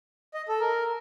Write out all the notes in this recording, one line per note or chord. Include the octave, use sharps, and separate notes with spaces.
D#5
A4
A#4